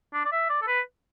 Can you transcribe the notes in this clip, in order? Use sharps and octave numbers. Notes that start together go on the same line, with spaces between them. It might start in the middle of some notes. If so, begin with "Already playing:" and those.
D4
D5
E5
D5
A4
B4